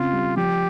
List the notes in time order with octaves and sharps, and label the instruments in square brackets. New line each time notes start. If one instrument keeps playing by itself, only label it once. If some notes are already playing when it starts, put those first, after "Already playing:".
Already playing: [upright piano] C#3 C4 [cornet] F4
[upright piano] G3
[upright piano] F3 [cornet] G4